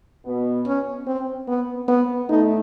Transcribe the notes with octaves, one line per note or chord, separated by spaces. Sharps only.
B2 B3
C#4
C4
B3
B3
A2 A3 D#4